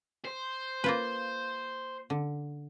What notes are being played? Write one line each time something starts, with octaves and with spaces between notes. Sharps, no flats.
C5
A#3 F4 B4
D3